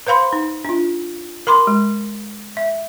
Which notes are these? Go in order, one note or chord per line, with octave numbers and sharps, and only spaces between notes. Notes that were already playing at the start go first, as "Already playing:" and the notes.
B4 C5 F5 B5 C6
D#4
D4 F4
A#4 B5 C6 D6
G#3
E5